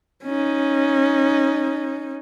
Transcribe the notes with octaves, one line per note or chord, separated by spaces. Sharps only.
C#4 D#4